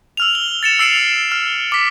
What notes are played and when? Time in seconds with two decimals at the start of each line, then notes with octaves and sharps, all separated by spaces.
0.17 E6 F6 F7
0.35 G7
0.63 A6 C#7 E7
0.79 E6 C7 D7 E7 F7
1.32 F6
1.72 D6 B6